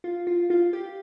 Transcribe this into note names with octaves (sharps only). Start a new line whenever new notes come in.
F4
F4
F4
G4